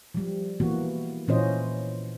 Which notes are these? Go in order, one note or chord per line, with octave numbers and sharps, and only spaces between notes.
F3 G3
E3 A#3 B3 F#4
A#2 E3 C#4 F4 C5 D#5